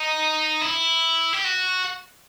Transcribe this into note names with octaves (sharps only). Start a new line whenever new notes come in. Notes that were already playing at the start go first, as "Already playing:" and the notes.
Already playing: D#4
E4
G4
F#4